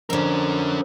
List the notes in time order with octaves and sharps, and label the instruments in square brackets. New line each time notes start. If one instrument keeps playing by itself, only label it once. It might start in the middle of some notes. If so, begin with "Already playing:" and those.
[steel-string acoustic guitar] F2 D3 [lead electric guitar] C#4 A#4